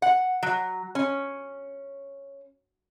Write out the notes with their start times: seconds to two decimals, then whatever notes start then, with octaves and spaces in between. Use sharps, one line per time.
0.02 F#5
0.43 F#3
0.95 C#4